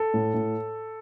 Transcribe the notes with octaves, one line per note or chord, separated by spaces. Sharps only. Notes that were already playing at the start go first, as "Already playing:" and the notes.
Already playing: A4
A2
A2